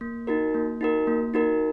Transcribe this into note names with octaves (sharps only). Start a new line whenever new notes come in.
A#3
D#4 F#4 A#4
A#3
D#4 F#4 A#4
A#3
D#4 F#4 A#4